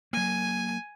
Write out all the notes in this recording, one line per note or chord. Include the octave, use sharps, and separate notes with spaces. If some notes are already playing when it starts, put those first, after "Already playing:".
F#3 A#3 G#5